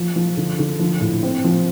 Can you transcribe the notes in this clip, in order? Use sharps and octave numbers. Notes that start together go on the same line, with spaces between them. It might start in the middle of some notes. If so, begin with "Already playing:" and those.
Already playing: F3
F3
D3
D3
F3
A2
C4
F3